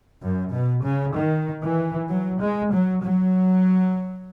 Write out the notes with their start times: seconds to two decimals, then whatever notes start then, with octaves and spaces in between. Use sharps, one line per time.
0.22 F#2
0.53 B2
0.84 C#3
1.16 D#3
1.63 E3
2.10 F#3
2.41 G#3
2.73 F#3
3.03 F#3